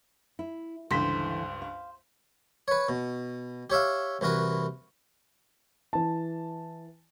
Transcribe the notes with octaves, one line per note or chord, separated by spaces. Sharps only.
E4
C#2 G2 D3 E3 C5 B6
F5
B4 C#5
B2
G4 C#5 E5 F5
C2 E3 F#4 A#4 B4
E3 A5